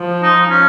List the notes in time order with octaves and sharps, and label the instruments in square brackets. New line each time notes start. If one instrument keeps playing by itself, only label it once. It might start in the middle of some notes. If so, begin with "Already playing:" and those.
Already playing: [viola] F3
[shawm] D#4
C#4